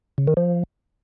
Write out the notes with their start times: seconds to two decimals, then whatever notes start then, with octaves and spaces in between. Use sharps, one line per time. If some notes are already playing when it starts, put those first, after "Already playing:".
0.18 C#3
0.28 D#3
0.37 F3